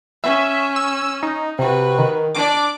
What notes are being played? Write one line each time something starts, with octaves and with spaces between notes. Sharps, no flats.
C#4 E5
E6
D#4
C3 F#4 B4
D#3
D4 D5 D6